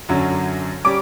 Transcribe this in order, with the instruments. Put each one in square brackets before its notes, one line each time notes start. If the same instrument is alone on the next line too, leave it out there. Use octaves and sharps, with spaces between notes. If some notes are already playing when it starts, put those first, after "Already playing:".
[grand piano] F#2 D3 F#3 C#4
G3 C#4 D6